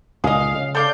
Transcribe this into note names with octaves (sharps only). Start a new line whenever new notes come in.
C#2 A#2 G#4 D#5 F5
C#3
A4 D5 F5 G6